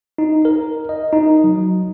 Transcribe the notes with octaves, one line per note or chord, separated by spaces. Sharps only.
D#4
A#4
D#5
D#4
F#3